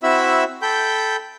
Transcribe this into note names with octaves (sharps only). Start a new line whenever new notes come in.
C4 E4 F#4 E5 B5 E6
A4 G5 B5 G6